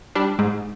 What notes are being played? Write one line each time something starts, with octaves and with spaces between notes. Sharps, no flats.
G3 D4
G#2